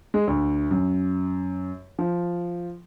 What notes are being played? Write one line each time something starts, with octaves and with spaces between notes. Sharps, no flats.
G#3
D2
F#2
F3